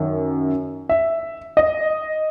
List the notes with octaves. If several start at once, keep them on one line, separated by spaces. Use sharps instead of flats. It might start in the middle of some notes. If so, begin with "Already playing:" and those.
Already playing: F#2 D#3
E5
D#5